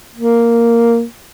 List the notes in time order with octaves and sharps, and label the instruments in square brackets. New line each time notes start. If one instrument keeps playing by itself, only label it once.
[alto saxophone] A#3